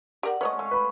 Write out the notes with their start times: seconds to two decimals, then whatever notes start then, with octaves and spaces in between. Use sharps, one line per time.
0.23 G4 A#4 D5 F#5
0.41 G#3 A3 C#4 B4 C#5 D#5
0.59 A3 F5 C#6
0.71 B4 B5